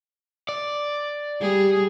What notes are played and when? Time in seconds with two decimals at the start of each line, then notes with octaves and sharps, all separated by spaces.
0.49 D5
1.41 G3 G#4